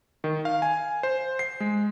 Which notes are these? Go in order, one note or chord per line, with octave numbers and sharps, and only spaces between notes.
D#3
F5
G#5
C5
C7
G#3